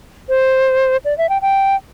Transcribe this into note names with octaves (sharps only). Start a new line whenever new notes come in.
C5
D5
E5
G5
G5